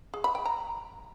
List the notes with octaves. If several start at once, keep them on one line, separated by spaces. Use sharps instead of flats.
G#4
B5
G5
A#5